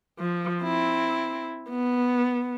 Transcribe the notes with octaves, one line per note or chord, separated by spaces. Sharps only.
F3
C4 E4
B3